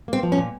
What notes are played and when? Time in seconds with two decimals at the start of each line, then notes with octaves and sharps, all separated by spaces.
0.08 A#3 C4
0.23 F3
0.32 C#4
0.38 A#2